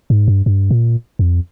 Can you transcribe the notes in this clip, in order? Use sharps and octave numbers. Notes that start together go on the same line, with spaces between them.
G#2
G2
G2
A#2
F2